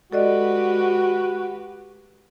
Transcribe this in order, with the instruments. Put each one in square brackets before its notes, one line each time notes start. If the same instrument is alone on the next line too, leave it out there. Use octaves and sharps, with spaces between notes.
[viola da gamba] G#3 G4 B4 [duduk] F#4 [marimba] A4 D5 D#5